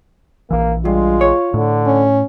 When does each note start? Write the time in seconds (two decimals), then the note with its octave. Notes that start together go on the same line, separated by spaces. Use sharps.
0.51 A#1 E3 A#3
0.85 G2 G#3 F4
1.21 C#5
1.54 A2 D3
1.86 C#4